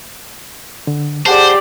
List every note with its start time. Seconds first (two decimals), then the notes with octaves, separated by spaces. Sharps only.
0.87 D3
1.26 G4 G#4 C5 D5 F#5 A5